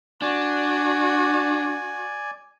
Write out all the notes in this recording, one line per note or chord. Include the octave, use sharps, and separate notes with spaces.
D4 F#4 D5 G#5